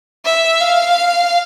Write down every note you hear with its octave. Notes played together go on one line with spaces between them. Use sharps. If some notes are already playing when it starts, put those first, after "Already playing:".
E5
F5